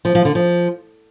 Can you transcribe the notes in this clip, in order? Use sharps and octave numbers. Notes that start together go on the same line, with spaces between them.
F3
F3
D3
F3